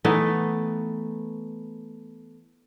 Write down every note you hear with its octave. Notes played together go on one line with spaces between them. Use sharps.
E3 A3 B3 D#4